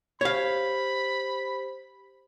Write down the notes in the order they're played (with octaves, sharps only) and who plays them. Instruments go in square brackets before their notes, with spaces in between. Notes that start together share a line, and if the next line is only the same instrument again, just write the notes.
[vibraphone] G4 C5 [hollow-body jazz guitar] C#5 F5 [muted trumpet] B5